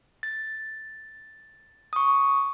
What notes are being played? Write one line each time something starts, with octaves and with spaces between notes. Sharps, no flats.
A6
C#6 D#6